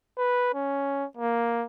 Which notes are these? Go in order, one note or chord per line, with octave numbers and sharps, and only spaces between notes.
B4
C#4
A#3